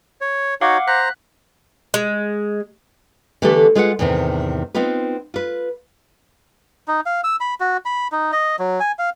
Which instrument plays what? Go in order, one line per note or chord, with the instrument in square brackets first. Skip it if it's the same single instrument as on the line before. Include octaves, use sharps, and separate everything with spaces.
[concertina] C#5
[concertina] D#4 F#4 C#5 [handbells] F5 F#5 D6
[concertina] C5 A#5 [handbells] F#6 B6
[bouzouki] G#3
[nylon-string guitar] D3 E3 A3 B3 G4 A4
G#3 F4 G#4 B4 D5 F#5
E2 A2 C3 D#3
B3 C4 D#4 F4 B4
F4 B4
[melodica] D#4
F5
E6
B5
F#4
B5
D#4
D#5
F#3
G#5
F5